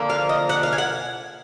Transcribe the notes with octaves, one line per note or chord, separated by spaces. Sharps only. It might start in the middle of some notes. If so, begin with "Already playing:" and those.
Already playing: D3 F3 A#3
F5
D#5
F#5
F5
G#5
F#5